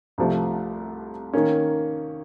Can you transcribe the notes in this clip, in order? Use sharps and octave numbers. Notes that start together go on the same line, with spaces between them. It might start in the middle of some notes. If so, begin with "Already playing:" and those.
C2 C3 F3 A3
D#3 A#3 C#4